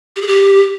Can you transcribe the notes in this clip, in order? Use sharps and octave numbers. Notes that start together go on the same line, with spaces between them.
G4
G#4
G4